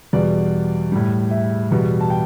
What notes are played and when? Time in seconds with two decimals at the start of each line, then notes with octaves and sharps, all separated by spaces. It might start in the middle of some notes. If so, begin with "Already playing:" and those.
0.13 E2 B2 G3 D5
0.92 A2 G3
1.31 E5
1.71 E2 B2 G3
2.01 A5
2.10 G5